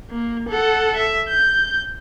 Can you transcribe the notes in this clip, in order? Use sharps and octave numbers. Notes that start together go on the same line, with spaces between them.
A#3
A4 F#5
E5
G6